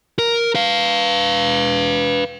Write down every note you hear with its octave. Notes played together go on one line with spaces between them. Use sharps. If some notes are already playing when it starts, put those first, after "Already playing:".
A#4
B4 F5